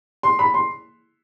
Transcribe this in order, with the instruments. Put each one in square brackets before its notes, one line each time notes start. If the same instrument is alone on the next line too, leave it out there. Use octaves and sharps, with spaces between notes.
[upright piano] C6
B5
C6